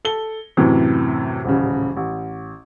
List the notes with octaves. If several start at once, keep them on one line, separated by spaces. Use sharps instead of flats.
A4 G7
F#2 A2 C3 E3
D#1 A1 C#3
A1